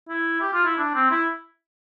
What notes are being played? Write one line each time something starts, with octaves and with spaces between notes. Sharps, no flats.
E4
G4
F4
E4
D4
C4
E4